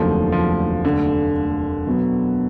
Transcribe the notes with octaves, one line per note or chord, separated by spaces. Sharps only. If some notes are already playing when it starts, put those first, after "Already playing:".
Already playing: F1 D#2 D3 F3 F#3 A3
F3
D3
B2 F#3 B3